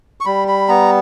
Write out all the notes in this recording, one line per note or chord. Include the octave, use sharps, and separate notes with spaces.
C#6
G3 B5
B5
B3 A#5